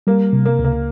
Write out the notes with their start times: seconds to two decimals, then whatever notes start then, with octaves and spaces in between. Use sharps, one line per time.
0.07 G3 A#3
0.33 C3
0.45 A#3
0.59 C#2
0.64 A#3